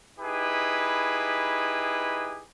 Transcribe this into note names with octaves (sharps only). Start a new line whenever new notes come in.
D#4 E4 G4 G#4 B4